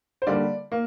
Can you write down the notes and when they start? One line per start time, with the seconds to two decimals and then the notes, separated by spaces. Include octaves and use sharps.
0.22 C5
0.27 D3 G3 A#3 D5
0.72 A#3